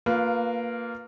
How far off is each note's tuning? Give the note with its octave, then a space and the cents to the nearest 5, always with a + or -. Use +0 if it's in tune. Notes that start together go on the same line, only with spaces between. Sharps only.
A#3 -15 F4 +15 B4 -10